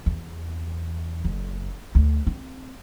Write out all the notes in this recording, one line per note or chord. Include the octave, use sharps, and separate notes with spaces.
E2
F#1
D2
C4